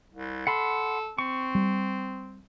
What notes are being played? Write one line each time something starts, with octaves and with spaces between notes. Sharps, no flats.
C2
A4 F#5 B5 C6
C4 C#6
G3